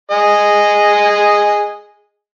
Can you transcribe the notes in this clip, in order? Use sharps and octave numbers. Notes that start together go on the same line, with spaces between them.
G#4 D#5 G#5